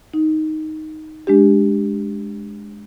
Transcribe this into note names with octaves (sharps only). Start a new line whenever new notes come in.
D#4
G#3 D4 G4